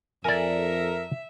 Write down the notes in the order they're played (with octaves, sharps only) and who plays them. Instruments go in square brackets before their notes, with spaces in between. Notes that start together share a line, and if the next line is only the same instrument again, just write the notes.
[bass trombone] F2 [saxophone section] A4 A#4 [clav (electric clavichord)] D5 G#5 [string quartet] E5